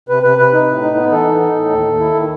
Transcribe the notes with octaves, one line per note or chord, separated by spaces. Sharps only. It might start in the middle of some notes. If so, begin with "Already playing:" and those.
C3 B4
C3 B4
C3 B4
D#4
A2
D#4
B3
E3 A4
D#4
D#4
A2
D#2
D#2
E4
D#3